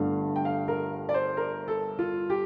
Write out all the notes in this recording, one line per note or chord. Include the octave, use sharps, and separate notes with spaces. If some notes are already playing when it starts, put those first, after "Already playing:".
Already playing: G1 G2 D3 A3 F5
G5
F5
A#4
D5
C5
A#4
A4
F4
G4